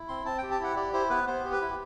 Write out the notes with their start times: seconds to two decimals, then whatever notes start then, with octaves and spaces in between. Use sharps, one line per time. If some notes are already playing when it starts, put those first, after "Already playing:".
Already playing: E4
0.08 C4 C6
0.25 C4 A5
0.38 G4 G5
0.51 A5
0.59 E4 F#5
0.76 G4 D5
0.93 E4 C5
1.10 B3 B4
1.27 B3 C5
1.44 G4
1.52 B4
1.61 E4